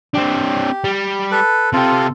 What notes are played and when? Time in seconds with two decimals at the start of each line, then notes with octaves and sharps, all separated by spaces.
0.14 C4 D4 G4
0.84 G3
1.31 A4 B4
1.73 C3 F4 G4 A4